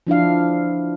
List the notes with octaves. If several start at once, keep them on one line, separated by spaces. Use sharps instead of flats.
F3 D4 E4 F5